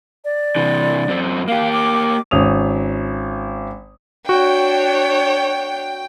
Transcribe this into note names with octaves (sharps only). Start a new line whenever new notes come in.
D5
C3 E3
F#2 C4
A#3 G4 F5
D6
G#1 C#4 D#6 F7
D4 F#4 C#5 G5